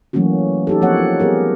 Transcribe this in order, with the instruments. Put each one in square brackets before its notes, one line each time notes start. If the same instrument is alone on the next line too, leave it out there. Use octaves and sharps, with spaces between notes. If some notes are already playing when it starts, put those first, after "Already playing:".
[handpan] E3 F#3 A3 A#3 C#4 F#4
D#4 G4 A4
F3 A#3 C4 C#5 F#5
D#4
G3 B3 G4 G#4 A#4